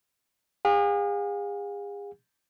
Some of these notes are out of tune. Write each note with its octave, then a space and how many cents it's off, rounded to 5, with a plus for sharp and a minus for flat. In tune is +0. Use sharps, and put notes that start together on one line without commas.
G#4 -40 F5 +40